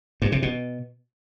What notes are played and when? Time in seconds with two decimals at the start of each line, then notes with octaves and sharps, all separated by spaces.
0.22 G2
0.32 C3
0.42 B2